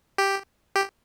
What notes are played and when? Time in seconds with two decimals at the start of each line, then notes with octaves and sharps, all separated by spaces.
0.18 G4
0.76 G4